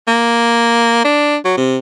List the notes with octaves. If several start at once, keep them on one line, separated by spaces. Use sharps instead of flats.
A#3
D4
F#3
C3